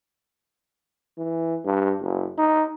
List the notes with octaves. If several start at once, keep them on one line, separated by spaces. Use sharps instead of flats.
E3
G2
F#1
D#4